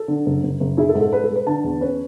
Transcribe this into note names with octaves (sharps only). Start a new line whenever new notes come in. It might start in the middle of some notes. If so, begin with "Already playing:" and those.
Already playing: A4
D3
F#1
F#1
F#1
E4 G#4
A4
G#2
A4
G#3 B4
A4
G#3
B4
D3 A5
E2
C#4 B4